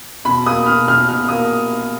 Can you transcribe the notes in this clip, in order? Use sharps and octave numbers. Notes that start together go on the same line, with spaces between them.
B2 B5
A#3 D#6
B2 F6
B2 F6
B2 F6
A#3 D#6